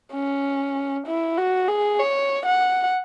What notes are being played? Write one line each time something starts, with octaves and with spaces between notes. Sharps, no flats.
C#4
E4
F#4
G#4
C#5
F#5